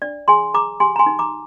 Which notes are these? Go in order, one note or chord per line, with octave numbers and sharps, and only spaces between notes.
D4 D5
G#4 G#5 C6
G#4 A#5 D6
G4 G#5 C6
A#5
G#5 C6
D#4
A#5 D6